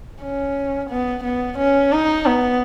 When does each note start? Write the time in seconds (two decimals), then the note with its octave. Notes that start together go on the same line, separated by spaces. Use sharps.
0.22 C#4
0.90 B3
1.24 B3
1.59 C#4
1.93 D#4
2.26 B3